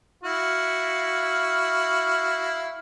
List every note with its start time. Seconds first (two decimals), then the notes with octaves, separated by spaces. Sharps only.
0.23 E4 F#4 F5